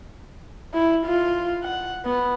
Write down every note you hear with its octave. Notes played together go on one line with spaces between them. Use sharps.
E4
F4
F#5
B3